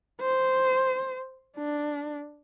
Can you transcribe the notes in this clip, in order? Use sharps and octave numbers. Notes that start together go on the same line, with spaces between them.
C5
D4